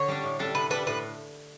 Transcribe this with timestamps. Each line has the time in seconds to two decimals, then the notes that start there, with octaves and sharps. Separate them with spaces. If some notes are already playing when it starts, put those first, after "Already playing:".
Already playing: D3 C#5
0.08 G3 D4
0.23 A2
0.39 G3 D4 A4
0.55 A2 B4
0.70 G3 D4 A4 B4
0.87 A2 B4